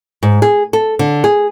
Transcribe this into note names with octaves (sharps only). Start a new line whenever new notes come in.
G#2
G#4
A4
D3
G#4